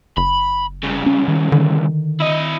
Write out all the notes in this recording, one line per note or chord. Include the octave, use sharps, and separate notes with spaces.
F#1 B5
C2 C#3
C#4
D#3
D3 D#3
E4 D#5